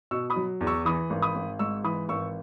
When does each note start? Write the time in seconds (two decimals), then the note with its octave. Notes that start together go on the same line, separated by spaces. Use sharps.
0.11 B2 C#6 E6
0.30 B5 D#6
0.36 F#3
0.61 E2
0.67 C#6 E6
0.85 E3 B5 D#6
1.10 G#1
1.22 B5 D#6
1.35 G#1
1.59 G#2 C#6 E6
1.84 E3 B5 D#6
2.09 G#1 C#6 E6